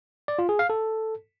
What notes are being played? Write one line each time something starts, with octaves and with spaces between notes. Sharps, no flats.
D5
F4
G#4
F5
A4